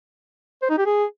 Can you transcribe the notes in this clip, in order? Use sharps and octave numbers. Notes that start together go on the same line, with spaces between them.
C5
D#4
G4
G#4